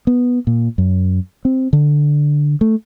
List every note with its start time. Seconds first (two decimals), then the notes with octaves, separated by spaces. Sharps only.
0.07 B3
0.47 A#2
0.78 F#2
1.45 C4
1.73 D3
2.61 A3